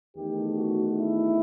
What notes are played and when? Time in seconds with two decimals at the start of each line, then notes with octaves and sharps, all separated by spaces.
0.17 E2 D#3 A3 G4
0.57 F#4
0.97 E4